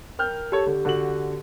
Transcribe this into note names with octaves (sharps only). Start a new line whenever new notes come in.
A#4 G5 F6 G6
G4 A4 C#5
D3
D3 F#4 F#7